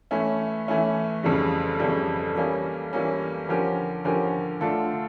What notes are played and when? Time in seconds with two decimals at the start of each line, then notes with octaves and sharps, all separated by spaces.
0.11 E3 A3 C#4 E4
0.68 E3 A3 C#4 E4
1.23 F2 C#3 E3 G3
1.79 F2 C#3 E3 G3
2.36 E3 G3 A#3 C#4
2.93 E3 G3 A#3 C#4
3.48 D3 F3 C#4 G4 A#4
4.05 D3 F3 C#4 G4 A#4
4.61 D3 A3 D4 F4 A4